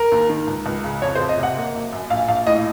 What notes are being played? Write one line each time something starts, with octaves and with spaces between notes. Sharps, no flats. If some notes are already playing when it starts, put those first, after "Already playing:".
Already playing: A#4
D#2
D#3
C#2
C#2
C#3
F2 C#5
C5
F2
D#5
C3
F#5
A#3
F#1
F#2
A#1 F5
A#1 F5
A2 D#5